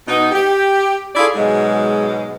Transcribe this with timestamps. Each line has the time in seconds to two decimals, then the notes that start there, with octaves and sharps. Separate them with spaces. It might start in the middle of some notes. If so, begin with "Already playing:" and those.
0.08 B2 B3 D#4
0.32 G4
1.16 E4 F4 G#4 A4 D5
1.35 G#2 B2 F#3 G#3